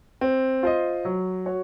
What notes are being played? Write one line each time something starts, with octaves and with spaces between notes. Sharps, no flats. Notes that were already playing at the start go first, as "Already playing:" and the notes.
C4
F4 C5 D#5
F#3
F#4 C#5